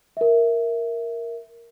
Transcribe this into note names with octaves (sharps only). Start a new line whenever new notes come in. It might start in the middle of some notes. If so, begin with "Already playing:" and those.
A#4 E5